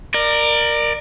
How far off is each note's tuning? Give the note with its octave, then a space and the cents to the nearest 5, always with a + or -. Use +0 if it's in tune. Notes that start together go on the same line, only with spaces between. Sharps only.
A#4 +0 D5 +25